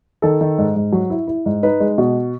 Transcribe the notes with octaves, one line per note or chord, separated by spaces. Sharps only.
D#3 A4
D#3
G#2
G#2
F#3
E4
E4
G#2
D#4 B4
G#3
B2